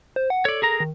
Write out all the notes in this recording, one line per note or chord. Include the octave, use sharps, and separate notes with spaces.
C5
F#5
A4 C#5 D5
G#4 A#4 A#5
D#3